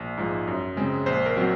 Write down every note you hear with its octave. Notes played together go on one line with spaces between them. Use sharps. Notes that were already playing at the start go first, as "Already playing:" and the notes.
Already playing: A#1
G#2 F3
F#2
C#3 G#3 C4
A#1 C5
A#4
F#3 C4